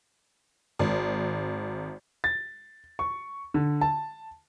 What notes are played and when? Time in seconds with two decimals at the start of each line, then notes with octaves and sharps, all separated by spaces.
0.79 G#1
2.24 A6
2.99 C#6
3.54 D3
3.81 A5